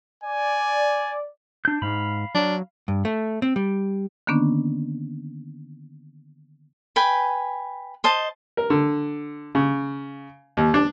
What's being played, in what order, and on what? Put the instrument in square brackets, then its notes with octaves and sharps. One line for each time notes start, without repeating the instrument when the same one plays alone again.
[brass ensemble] D5 [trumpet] G#5
[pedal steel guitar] D4 G6
[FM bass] G#2 [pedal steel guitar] F5 B5
[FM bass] F#3 [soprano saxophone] D4
[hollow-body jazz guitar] G2
A3
C4
G3
[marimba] D3 D#3 A#3 B3 C#4 D4
[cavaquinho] B4 G5 G#5 B5
C5 D#5 A5
[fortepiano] A#4
D3
C#3
D#2
D4